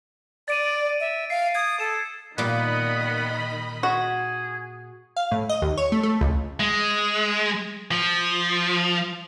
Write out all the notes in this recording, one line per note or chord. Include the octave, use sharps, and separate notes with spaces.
D5 A6 D7 D#7
E5
F5 C7
D#6 G#6
A4 E7
A#2 D#3 G3 B3 D#5 B5
F#4 G#4
F5
A2
D#5
D#2
C#5
A3
A3
C#2
G#3
F3